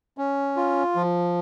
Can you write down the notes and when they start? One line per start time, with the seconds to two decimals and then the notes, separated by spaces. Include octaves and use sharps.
0.18 C#4
0.57 F4
0.96 F3